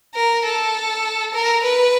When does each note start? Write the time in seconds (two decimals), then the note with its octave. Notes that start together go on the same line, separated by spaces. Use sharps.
0.15 A#4
0.45 A4
1.34 A#4
1.63 B4